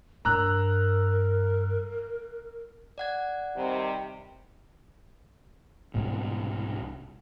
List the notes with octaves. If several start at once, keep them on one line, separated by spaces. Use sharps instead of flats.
G2 D4 A#4 A#5 E6 F#6
D5 F#5 G#6
C3 D#3 G3
C2 G#2 B2